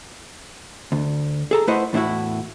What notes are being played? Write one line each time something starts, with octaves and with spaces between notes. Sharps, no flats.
D2
G#4 A4 A#5
A3 E4 B4 C5 D#5 F#5
E2 A2 D4 E4 F#4